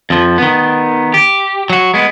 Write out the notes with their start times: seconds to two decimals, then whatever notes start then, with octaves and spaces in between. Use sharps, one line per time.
0.10 F2 F3
0.38 D#3 B3
1.14 G4
1.70 F#3 F#4
1.94 G#3 B3